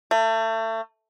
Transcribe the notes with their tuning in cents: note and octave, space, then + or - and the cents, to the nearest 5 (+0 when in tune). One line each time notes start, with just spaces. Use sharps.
A3 +30